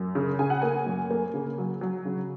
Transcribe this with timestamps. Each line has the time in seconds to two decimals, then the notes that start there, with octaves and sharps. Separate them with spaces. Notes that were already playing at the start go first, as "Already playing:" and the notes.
Already playing: F#2
0.15 C#3
0.39 C#3 G#5
0.50 F#5
0.62 A#3 G#5
0.86 F#2
1.10 A#3
1.34 C#3
1.58 F#3
1.81 F#3
2.05 C#3